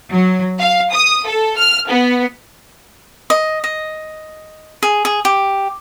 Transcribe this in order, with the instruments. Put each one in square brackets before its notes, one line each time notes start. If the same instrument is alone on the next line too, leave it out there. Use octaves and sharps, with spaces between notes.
[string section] F#3
F5
D#6
A4
F6
B3
[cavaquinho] D#5
D#5
G#4
G#4
G4